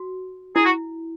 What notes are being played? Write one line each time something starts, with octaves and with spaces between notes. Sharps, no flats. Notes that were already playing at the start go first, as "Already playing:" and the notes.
Already playing: F#4
E4 G#4
F#4